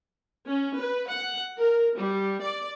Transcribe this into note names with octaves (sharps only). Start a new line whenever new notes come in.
C#4
B4
F#5
A#4
G3
D5